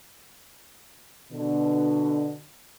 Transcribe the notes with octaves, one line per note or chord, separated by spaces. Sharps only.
B2 D3